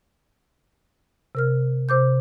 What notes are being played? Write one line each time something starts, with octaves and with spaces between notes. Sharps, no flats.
C3 A#4 F6
C3 C5 D6 G6